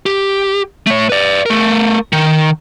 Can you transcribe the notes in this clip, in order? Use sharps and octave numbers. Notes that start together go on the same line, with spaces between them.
G4
A3 C#5
B4 D5
A3 A#4
D#3